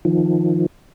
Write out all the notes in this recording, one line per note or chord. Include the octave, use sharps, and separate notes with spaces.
D#3 F3